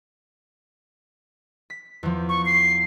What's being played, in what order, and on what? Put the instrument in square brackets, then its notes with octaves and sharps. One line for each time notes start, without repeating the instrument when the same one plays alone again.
[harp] B6
E2 F3
[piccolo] C#6
C7